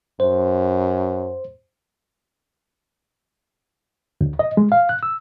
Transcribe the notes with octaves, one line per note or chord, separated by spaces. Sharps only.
F#2 C5
D2
D#5
G#3
F5
F#6
E6